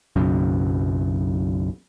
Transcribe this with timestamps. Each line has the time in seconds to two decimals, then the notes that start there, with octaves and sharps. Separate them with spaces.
0.16 B1 F#2 C#3